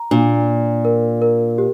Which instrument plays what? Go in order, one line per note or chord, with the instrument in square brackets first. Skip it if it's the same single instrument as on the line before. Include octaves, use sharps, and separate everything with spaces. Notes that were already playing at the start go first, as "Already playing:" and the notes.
Already playing: [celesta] A#5
[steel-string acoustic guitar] A#2 [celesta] D4
[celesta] D4
A#4
A#4
G4